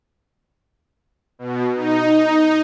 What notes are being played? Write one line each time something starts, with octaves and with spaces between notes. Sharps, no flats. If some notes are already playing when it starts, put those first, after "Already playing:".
B2
D#4